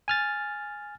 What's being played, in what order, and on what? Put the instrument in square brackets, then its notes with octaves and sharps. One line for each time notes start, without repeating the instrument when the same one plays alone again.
[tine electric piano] G#5 F6 A6